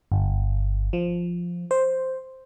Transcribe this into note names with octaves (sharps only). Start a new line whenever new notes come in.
G1
F3
C5